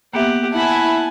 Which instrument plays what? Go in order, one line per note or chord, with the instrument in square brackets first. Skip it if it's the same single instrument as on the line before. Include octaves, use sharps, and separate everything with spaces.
[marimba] A#3 B3 E5 [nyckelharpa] G4 F#5
[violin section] E4 [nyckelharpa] F#5 [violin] G#5 A5